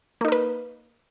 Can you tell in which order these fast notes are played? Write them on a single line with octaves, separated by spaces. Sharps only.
A#3 D#4 A#4 B4